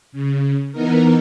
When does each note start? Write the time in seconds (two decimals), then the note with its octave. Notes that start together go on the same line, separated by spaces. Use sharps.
0.12 C#3
0.72 E3 B3 D#4 A#4